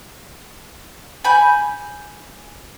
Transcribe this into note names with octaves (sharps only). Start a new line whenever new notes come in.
G#5 B5 G6